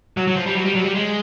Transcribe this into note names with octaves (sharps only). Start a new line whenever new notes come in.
F#3
F#3
F3
G3
F#3
G3
F#3
G3
G#3